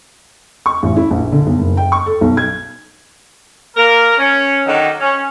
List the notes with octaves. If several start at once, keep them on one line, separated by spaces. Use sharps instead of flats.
C#6
A1
E4
A#1
D3
B1
F#1
G5
C#6
A4
B1
G#6
A#3 A#4
C#4
D3 D#3 F#3 D#4
C#4